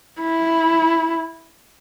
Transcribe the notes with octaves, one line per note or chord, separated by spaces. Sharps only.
E4